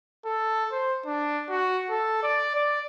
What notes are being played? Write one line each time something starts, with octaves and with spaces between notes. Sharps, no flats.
A4
C5
D4
F#4
A4
D5
D5